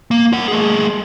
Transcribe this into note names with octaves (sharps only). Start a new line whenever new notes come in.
A#3
A#4 F#5
A3 G#4